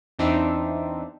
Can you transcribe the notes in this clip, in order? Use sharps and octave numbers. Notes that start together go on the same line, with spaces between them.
E2 C4 D4 D#4 E5